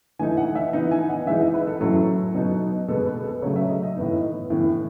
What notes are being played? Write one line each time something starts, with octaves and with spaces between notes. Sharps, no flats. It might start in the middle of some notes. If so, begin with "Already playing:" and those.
E3 A3 D#4 G#5
F#5
E5
E3 B3 D#4 D#5
G#5
F#5
E3 G#3 D#4 E5
D#5
B4
A4
A2 F#3 C#4 A4
B2 F#3 B3 D#4
B2 G#3 B3 A4
B4
A4
C#3 F#3 A3 C#5
E5
D#5
D#5
A2 E3 B3 D#4
A2 E3 B3